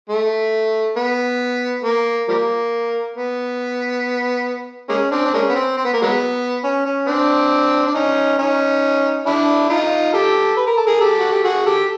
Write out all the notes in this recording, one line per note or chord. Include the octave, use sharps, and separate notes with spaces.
A3
B3
A#3
F3 G3 A#3
B3
G#3 A#3 C#4
C4 D4
D4
G#3 A#3 C#4
B3
C4
C4
B3
A#3
F#3 G#3 B3
C#4
C#4
C4 D4
D4
C#4 D#4
C#4 D#4
D4 E4
D#4 F4
G4 A4
B4
A#4
A4
G#4 A#4
G4 A4
F#4
G4
F#4 G#4
G4 A4